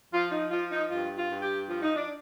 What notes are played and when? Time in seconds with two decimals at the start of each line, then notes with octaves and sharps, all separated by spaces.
0.12 F3 F4
0.31 D#4
0.51 F3 F4
0.71 D#4
0.90 G2 F4
1.17 F4
1.30 G2
1.42 G4
1.69 F3 F4
1.83 D#4
1.96 D4